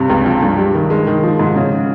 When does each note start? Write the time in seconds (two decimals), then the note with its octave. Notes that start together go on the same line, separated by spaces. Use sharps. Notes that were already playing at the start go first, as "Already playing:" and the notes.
Already playing: G2 C3
0.09 C#2
0.26 F3
0.42 G2
0.58 G3
0.75 D#3
0.90 G#3
1.07 D#3
1.24 F3
1.39 G#2
1.56 C#3